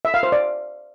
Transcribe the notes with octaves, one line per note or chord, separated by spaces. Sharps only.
E5
F5
C5
D5